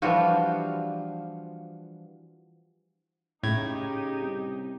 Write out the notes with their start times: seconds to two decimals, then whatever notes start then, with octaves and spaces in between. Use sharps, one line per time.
0.02 E3 F3 G3 D4 F4 F#4
3.43 A2 C#3 D#4 G4 G#6
4.21 C2